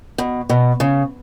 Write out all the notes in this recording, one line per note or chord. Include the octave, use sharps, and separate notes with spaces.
B2
B2
C#3